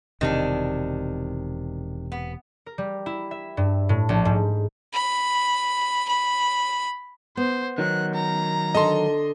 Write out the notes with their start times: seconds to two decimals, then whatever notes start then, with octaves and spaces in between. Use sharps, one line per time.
0.21 E1 C3 D#3 D4
2.12 B3
2.66 A#4
2.78 G3
3.06 E4
3.31 E5
3.57 G2
3.89 A2
4.09 A#1
4.25 G#2
4.93 B5
6.08 B5
7.37 B3 C5
7.78 D#3 F#3 F#6
8.14 A#5
8.75 D3 A4 D#5 C6